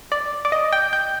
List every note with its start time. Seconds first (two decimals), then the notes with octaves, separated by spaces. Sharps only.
0.12 D5
0.45 D5
0.52 D#5
0.73 G5
0.93 G5